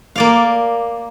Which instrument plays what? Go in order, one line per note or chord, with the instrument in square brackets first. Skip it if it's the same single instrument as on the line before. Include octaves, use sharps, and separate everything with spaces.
[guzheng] A#3 D5 F5